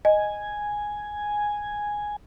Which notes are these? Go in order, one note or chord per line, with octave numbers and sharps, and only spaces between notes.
D#5 G#5